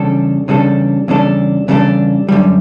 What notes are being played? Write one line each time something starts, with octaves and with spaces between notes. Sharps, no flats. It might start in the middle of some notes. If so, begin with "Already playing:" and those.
Already playing: E2 C#3 G3 D4 A4
E2 C#3 G3 D4 A4
E2 C#3 G3 D4 A4
E2 C#3 G3 D4 A4
F#2 D3 G3